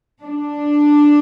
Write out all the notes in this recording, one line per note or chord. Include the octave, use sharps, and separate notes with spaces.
D4